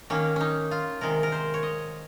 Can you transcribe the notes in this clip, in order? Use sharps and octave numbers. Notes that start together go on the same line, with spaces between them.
D#3 A#3 C#4
C#4 D#4
F4
C3 D#3 G#3 A#4
A#4
C5
C#5
D#5